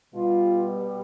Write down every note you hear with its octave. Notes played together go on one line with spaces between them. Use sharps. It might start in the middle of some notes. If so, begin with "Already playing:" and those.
B2 G3 F4